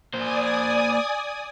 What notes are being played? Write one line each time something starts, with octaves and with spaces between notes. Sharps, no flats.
A#3 C5 D5 G#5 D#6